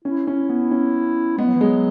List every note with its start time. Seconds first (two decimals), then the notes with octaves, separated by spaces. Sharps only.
0.04 C#4 E4
0.27 C#4
0.49 B3
0.71 C#4
1.38 G#3 B3
1.46 F#3
1.54 E3
1.61 F#3 G#3